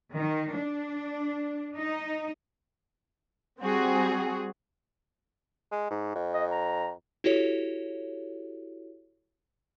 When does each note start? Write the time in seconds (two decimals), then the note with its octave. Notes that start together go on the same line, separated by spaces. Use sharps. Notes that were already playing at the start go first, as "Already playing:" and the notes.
0.15 D#3
0.56 D4
1.77 D#4
3.60 G3 C4 F#4 G#4
5.72 G#3
5.91 G#2
6.15 F2
6.33 D#5
6.50 A#5
7.24 E4 F#4 G4 A4 C#5